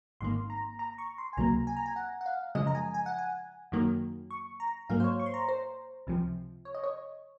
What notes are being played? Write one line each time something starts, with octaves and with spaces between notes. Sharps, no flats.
G#1 G#2 D#3 A#3 C6
A#5
A#5
C#6
C6
G#5
C#2 C3 F#3 A#3 A#5
G#5
A#5
G#5
F#5
F#5
F5
F#2 C#3 F3 G#3 D#5
A#5
G#5
G#5
F#5
G#5
F#2 D#3 F#3 A#3
C#6
A#5
G#2 F#3 A#3 F5
C5
C#5
C#6
C6
A#5
C5
C#2 C3 F3
C#5
D#5
C#5